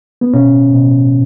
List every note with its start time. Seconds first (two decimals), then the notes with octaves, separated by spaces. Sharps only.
0.21 B3
0.34 B2 C#4
0.73 B2